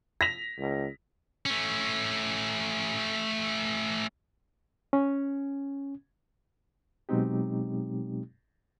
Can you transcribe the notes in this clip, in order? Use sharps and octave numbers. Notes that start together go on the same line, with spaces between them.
A#6 B6 F7
C#2
A3 C#4
C#4
B2 F#3 G#3 C4 D#4 G4